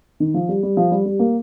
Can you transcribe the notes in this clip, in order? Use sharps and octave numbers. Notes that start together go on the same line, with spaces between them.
D#3
F3
G3
G3
F3
G3
G3
A#3